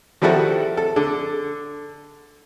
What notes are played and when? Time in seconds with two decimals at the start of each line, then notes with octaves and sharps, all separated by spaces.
0.22 D#3 F3 G3 E4 F#4 A4
0.77 A4
0.96 D3